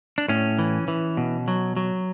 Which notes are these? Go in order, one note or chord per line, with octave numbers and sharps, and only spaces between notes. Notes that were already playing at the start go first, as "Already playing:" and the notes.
D4
A2 C#4
E3
E3
B2
F#3
F#3